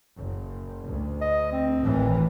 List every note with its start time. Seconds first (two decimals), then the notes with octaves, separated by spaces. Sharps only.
0.15 F#1
0.89 D2
1.21 D#5
1.52 C4
1.82 G#1 A2 E3